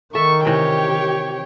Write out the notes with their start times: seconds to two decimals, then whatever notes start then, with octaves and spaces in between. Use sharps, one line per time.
0.15 D#3 A4 E5 C#6
0.45 C3 E3 G4 C#5 G5